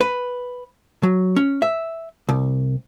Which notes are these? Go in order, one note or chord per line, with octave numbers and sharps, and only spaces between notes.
B4
F#3
C#4
E5
C2